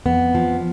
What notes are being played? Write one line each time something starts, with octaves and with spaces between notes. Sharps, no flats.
F2 B3
F3